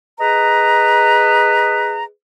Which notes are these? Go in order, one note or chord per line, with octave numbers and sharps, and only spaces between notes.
G#4 B4 D#5 A#5